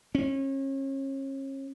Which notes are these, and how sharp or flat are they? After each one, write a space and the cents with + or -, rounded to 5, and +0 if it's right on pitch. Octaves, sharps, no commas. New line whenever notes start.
C#4 -35